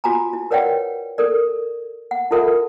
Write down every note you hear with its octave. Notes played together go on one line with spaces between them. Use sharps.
F4 F#4 G#5 A#5
E4
A#4 B4 C#5 D5 F#5 G5
A4 A#4 D5
F#5
E4 F4 A4 A#4 E5 F#5